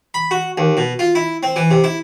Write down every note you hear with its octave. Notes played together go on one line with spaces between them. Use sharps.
B5
F#4
D#2
B2
F4
E4
C4
E3
C3
E4